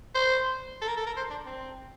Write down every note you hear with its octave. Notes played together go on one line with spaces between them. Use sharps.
C5
A4
A#4
A4
A#4
C5
D4
C4